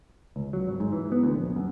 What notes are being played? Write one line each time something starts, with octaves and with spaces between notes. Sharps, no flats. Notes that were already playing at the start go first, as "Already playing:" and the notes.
C#2
F#3
G#1
G#2
E3
B3
D2
A#1
F#2